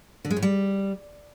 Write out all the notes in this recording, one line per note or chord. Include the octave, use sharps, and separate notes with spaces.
D3
G#3
A2
G3